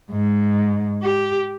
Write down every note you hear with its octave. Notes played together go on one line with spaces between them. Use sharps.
G#2
G4